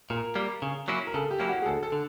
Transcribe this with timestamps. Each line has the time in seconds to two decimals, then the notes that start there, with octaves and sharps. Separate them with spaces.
0.10 A#2 A#4
0.35 G3 A#3
0.62 C#3
0.88 F#3 A#3 C#4 E4
1.07 A#4
1.14 C#3 A4
1.31 G4
1.40 F#3 A#3 C#4 E4
1.49 F#4
1.62 G#4
1.66 D2 A4
1.83 A4
1.92 D3